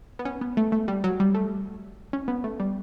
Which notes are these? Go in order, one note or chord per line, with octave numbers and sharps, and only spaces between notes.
B3
C#4
B3
A3
A3
G3
F#3
G3
A3
C#4
B3
A3
G3